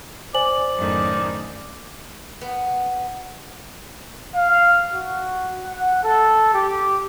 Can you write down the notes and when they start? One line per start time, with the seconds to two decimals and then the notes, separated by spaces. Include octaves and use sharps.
0.34 C5 D5 G#5 F#7
0.76 F#2 A2 D#3
2.41 B3
4.34 F5
4.93 F#4
5.63 F#5
6.03 A4
6.53 G4